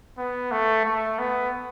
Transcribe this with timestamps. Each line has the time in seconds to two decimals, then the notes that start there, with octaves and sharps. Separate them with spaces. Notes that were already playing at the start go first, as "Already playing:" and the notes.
0.18 B3
0.51 A3
0.85 A3
1.19 B3